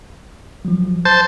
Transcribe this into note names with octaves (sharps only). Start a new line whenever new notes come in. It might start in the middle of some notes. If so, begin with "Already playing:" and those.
F3 F#3
C5 A5 G6